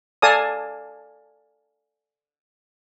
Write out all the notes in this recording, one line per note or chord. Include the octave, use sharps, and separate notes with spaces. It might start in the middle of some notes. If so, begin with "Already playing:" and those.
A4 D5 F5 G#5 A5 D#6